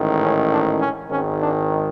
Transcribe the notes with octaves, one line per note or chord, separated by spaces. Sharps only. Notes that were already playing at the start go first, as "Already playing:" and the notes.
Already playing: A1 G#2 D#3
C#4
D4
C#4
G#1 G#2 D#3 C#4
D4